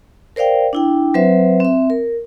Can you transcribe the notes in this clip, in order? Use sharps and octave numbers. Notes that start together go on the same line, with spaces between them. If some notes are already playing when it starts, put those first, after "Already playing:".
A#4 C5 D5 F5 G5
D4 E4 G5
F#3 C4 B4 C5 E5
C4 E5
A#4